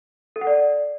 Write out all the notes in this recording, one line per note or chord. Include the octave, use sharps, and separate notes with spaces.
A4
F#5
D5